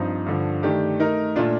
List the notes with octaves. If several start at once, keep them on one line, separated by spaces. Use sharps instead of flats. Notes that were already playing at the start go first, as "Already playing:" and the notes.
Already playing: G2 F3 C4 D#4
G2 D3 F3
D#3 A3 D4 G4
A3 D#4 A#4
A#2 A3 D4 F4